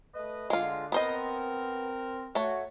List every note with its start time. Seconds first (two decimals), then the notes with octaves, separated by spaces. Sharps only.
0.13 A3 B4 D#5
0.50 D3 G#3 F4
0.92 B3 C4 A#4 C5 D#5
2.35 A3 F#4 C#5